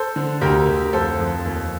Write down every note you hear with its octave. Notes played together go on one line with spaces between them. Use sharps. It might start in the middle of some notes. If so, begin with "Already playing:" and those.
Already playing: A4 C5
D3
D2 G4 A#4
D2
F2 A4 C5
F2
D#2